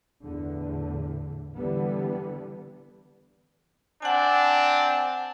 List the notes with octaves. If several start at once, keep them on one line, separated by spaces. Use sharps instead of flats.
E2 A2 D3
D3 E3 G3 B3
C4 D4 F#5 G#5